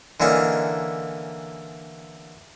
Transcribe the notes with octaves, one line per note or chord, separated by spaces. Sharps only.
D3 E3 A#3 C#4 D#4